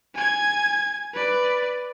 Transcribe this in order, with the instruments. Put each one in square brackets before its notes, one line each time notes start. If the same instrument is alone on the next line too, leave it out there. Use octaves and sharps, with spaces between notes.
[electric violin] G#5 G#6
B4 D5